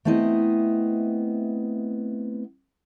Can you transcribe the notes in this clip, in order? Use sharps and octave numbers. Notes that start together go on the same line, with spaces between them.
A3 B3 C4 E4 D#5